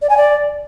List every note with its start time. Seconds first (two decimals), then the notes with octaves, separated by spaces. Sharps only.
0.02 D5
0.09 G#5
0.17 D5